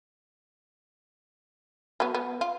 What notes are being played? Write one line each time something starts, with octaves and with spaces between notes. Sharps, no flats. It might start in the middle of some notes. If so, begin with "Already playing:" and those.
F#3 B3
B3
F4